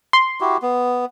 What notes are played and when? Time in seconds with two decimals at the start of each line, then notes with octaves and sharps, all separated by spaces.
0.13 C6
0.40 E4 F#4 G4
0.62 B3